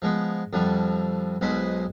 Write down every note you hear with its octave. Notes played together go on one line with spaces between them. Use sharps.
F3 G#3 B3
F2 D3 F3 G3
B1 B2 G#3 C5 B5